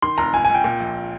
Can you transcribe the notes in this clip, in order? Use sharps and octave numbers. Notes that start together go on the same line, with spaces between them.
D#3 C6
F1 A#5
C#2 G#5
G#5
C#2
G5
A#2
A#1